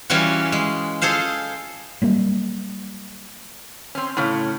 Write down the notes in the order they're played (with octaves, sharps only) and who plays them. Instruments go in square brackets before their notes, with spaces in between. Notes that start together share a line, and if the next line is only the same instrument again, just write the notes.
[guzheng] E3 G3 C#4 F4 F#4
G#3
F4 G#4 A4 C5 F5
[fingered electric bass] F#3 G3 A#3
[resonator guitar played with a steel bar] C4 C#4
A2 C#3 C#4